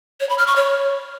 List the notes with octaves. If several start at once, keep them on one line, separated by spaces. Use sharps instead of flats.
C#5
B5
F6
C#6
C#5